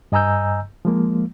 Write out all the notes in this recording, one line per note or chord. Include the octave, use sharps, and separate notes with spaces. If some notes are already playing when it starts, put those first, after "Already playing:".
G2 D#5 G#5 A#5 E6 G6
F3 G#3 A#3